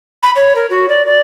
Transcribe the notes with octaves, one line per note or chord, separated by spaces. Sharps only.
B5
C#5
A#4
F#4
D5
D5